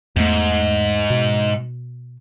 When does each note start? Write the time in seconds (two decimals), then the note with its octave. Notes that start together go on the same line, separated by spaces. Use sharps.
0.16 E2 G#2 A3
1.10 B2